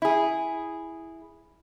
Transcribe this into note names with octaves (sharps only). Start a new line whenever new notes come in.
E4 G#4